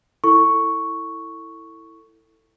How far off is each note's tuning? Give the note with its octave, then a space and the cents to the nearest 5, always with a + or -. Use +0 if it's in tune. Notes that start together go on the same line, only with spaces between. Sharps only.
E4 +0 A4 +25 C#6 +0